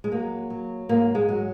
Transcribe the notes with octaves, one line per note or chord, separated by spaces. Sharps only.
G#3
F#3 A#3
F#3
G#2 A#3
G#3
F#3